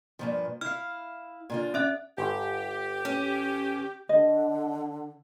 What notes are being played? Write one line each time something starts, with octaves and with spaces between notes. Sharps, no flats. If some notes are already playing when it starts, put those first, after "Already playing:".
G2 A#2 F3
E4 F5 F6
A#2 D3 F4
C#4 D5 E5 F#6
G1 G4
C#4
D3 D#5